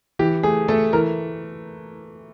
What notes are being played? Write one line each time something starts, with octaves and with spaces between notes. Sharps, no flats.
E3 G4
A3 G#4
A3 A4
E3 A#4